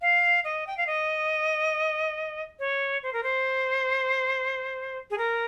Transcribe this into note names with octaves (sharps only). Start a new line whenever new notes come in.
F5
D#5
G5
F5
D#5
C#5
C5
A#4
C5
G#4
A#4